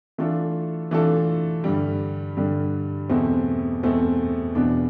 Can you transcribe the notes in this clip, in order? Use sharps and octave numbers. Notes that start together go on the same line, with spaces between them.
E3 A3 D4 F4 A4
E3 A3 D4 F4 A4
G2 D3 G3
G2 D3 G3
E2 B2 A3 C4
E2 B2 A3 C4
E1 E2 B2 B3 D4